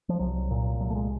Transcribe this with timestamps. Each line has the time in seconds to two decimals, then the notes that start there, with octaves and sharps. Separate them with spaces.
0.09 F3
0.19 C2 F#3
0.51 A#2
0.80 C2 F#3
0.90 A3
0.95 G#3